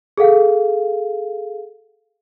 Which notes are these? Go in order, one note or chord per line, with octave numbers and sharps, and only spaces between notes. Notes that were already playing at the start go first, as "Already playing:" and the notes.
G#4 A4 F5 F#5